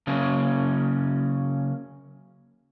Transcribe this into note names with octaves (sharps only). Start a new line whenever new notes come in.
C#3 F#3 A#3 C#4